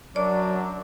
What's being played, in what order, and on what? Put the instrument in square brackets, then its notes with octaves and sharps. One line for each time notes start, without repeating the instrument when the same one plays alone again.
[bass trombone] F#2 [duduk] F#3 [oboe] D4 [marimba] D5